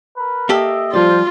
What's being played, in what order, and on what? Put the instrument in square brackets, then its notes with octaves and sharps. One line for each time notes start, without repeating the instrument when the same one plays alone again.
[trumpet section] A#4 B4
[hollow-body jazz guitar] A#3 G4 A4 [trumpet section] D#5 E5
[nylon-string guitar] F3 G3 D5 [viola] F4 [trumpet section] C5